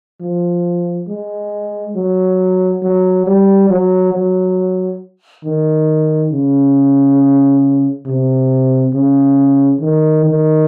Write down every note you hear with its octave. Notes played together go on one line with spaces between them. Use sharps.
F3
G#3
F#3
F#3
G3
F#3
F#3
D#3
C#3
C3
C#3
D#3
D#3